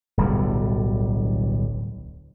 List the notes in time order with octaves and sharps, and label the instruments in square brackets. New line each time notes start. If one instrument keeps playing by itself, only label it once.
[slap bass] D1 B1 D3 G3